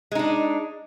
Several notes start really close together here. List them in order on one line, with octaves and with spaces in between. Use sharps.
G#3 D#4 D4